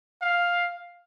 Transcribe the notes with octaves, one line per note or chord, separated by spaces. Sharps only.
F5